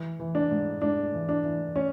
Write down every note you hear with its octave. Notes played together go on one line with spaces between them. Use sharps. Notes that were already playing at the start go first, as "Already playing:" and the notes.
Already playing: E3
E3
D4
G#2
G#2 D4
E3
D4
E3
C#4